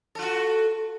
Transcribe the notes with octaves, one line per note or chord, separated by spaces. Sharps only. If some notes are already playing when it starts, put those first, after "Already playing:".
F4 F#4 A4